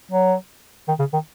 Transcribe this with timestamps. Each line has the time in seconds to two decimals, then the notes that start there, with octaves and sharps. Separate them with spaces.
0.11 F#3
0.88 D#3
0.99 C#3
1.13 D#3